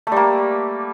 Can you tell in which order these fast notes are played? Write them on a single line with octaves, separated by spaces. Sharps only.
A3 G3 A#3